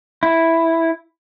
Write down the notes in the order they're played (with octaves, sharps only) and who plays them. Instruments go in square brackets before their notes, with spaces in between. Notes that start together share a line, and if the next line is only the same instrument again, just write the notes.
[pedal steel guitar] E4